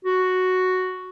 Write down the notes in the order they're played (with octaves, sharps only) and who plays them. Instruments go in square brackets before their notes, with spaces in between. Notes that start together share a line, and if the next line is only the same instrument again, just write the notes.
[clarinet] F#4